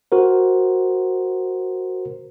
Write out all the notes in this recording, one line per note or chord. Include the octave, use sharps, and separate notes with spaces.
F#4 A#4 C5